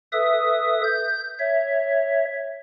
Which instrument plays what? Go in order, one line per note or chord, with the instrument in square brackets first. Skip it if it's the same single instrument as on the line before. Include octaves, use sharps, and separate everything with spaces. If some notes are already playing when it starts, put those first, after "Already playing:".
[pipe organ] A4 B4 E5 D#6
G6
C#5 E5